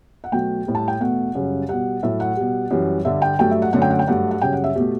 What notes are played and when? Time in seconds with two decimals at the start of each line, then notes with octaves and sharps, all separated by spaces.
0.24 F#5
0.32 B2 F#3 A3 G5
0.67 A2 G3
0.75 A5
0.88 G5
1.00 E2 B2 A3 F#5
1.35 F#2 C#3 G3
1.69 B2 G3 F#5
2.03 A2 F#3 A3 E5
2.20 F#5
2.37 B2 G3
2.71 F#2 E3 G3
3.05 G2 D3 G3 E5
3.22 G5
3.39 G2 F#3 A3 G5
3.51 E5
3.62 F#5
3.73 F#2 D3 A3 F#5
3.82 G5
3.90 F#5
3.99 G5
4.07 G2 F#3 A3 F#5
4.31 F#5
4.41 F#2 C#3 G3 G5
4.53 F#5
4.64 E5
4.75 B2 A3 G4